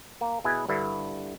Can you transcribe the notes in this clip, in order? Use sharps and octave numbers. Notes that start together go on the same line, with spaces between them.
A#3
B2 E4 G#4 B4 G#5
G2 D3 E4